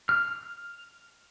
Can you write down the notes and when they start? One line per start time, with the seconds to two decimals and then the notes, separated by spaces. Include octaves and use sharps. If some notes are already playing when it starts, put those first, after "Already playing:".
0.09 F6